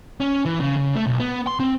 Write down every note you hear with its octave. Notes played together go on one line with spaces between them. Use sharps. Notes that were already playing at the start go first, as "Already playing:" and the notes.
C#4
E3
C#3
C#3
A3
B1
B3
C6
C4